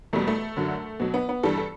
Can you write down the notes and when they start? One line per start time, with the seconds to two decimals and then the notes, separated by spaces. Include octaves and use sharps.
0.13 E2 B2 G3 A3
0.27 A3
0.57 F#2 D3 F#3
1.00 B2 F#3
1.14 B3
1.29 B3
1.43 G2 E3 G3 A4
1.57 A4